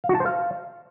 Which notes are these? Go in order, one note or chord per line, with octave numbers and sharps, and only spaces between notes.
F5
F#4
A5
C5
F5